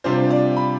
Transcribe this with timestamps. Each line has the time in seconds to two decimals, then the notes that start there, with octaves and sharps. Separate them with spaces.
0.04 C3 G3 D4 F4 C5
0.30 D5
0.57 B5